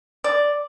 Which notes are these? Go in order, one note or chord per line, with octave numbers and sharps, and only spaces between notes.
D5